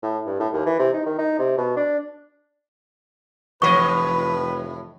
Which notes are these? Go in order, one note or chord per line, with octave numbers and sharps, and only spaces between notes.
A2
G2
A2
D#2
E3
C3
D#4
D#3
D#4
C3
B2
D4
F1 A2 E3 B4 D#5 C#6